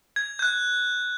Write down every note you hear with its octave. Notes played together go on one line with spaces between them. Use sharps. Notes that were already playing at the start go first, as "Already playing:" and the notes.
G#6
F#6 G6